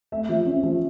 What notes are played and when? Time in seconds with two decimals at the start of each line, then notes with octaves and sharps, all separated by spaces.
0.12 A3 E5
0.29 F3
0.46 C#4
0.63 F3